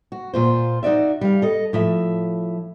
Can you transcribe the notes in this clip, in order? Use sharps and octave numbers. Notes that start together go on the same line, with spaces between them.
F#4
A#2 F4 C5
D#4 F#4 D5 E5
G3 F5
A4 D#5
A2 F3 E5